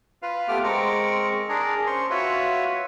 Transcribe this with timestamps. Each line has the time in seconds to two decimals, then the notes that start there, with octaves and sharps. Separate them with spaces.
0.22 F4 B4 F5
0.48 A3 B3 G4 D6 F6
0.63 G#3 C4 A#4 C#6 D6
1.49 D4 G#4 A#4
1.87 C#4 C5 C6 C#6
2.10 F4 F#4 B4 C#5 E5